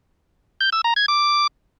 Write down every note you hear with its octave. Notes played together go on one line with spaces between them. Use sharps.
G6
E6
A#5
G#6
D6